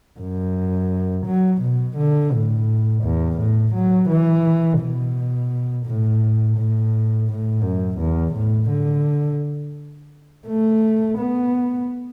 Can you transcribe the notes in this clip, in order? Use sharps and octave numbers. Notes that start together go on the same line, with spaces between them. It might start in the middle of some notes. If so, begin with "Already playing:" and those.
F#2
F#3
B2
D3
A2
E2
A2
F#3
E3
B2
A2
A2
A2
F#2
E2
A2
D3
A3
B3